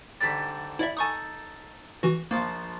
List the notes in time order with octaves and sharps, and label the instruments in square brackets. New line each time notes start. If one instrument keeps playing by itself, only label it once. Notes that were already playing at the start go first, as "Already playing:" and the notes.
[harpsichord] G#2 D3 G3 [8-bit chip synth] A6 B6
[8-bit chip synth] E4 D5 E5
[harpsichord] D#4 A4 [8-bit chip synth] G#5 C#6 D#6
[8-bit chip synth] E3 F#4
[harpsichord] A#1 F3 C5 [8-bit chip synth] A#3